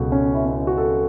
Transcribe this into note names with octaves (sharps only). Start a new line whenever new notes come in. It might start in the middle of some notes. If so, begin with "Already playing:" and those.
Already playing: C#2 B2 F#3 F#4 A4
C#4
E4
C#4
E4
F#4
A4